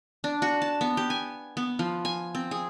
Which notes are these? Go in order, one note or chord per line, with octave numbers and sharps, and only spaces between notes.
D4
F#4
A5
B3
G4
G#5
B3
F3
G#5
C4
G#4